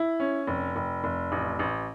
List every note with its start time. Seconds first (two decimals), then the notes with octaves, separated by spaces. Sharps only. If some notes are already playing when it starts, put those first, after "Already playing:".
Already playing: E4
0.20 C#4
0.47 F1
0.76 F1
1.04 F1
1.32 A1
1.59 A1